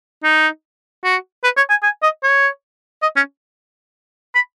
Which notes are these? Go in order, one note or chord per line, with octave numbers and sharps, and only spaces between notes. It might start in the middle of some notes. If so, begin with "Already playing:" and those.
D#4
F#4
B4
C#5
G#5
G#5
D#5
C#5
D#5
C#4
B5